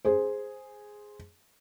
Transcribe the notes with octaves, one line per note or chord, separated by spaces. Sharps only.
G#4 C5